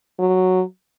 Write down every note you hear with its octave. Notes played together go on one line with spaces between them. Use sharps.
F#3